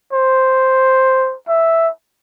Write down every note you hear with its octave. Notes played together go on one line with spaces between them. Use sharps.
C5
E5